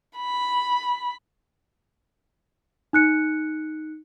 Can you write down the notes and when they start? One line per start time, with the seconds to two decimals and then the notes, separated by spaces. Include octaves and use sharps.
0.17 B5
2.93 D#4 F#6 C#7